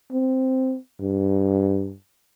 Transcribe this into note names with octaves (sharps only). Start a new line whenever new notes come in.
C4
G2